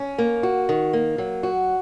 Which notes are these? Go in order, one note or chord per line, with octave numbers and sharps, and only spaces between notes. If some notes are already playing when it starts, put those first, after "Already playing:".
Already playing: C#4
A#3
F#4
D#3
A#3
F#3
F#4